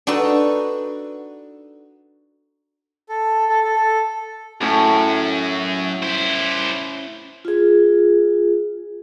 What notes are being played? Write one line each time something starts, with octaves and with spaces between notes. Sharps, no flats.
D4 D#4 F#4 A4 B4
A4
A4
A4
A4
F#2 A2 C#4 C#6
E4 C5
F4 G#4